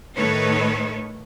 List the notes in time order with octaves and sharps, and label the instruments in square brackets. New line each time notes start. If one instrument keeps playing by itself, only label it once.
[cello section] A2 D#3 A3 A4 B4 C#5